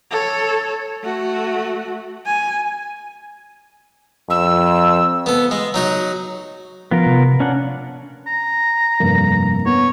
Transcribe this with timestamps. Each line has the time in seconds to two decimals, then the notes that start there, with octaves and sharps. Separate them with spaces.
0.11 A4 C#5
1.04 A3 F#4
2.26 G#5
4.30 F2 E6
5.26 B3 A4
5.51 G#3
5.74 F#3 D#4 F#4
6.91 F3 B3 F4 A#4
7.06 C3
7.40 C#4 D4 F#5
8.27 A#5
9.00 F1 G2 A#3
9.66 B3 C#5